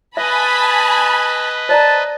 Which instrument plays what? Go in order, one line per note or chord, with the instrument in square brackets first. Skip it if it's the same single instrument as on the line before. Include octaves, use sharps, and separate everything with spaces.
[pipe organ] B4 D#5 [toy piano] E5 [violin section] G#5 A5 B5
[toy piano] C5 D5 A#5 [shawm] A5